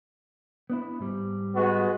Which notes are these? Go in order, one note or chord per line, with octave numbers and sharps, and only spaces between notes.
B3 D4 E4
G#2 G3
G#3 B3 F#4